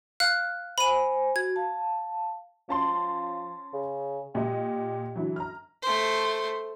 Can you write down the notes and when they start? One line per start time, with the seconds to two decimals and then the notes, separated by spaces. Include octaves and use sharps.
0.20 F5 F6 F#6
0.78 C5 G#5 B5 D#7
1.36 F#4 G#6
1.56 F5 A5
2.69 F3 C#4 A5 C6
3.73 C#3
4.35 A#2 G4 D#5
5.15 D3 E3 F#3
5.36 A#5 F6
5.82 A3 C5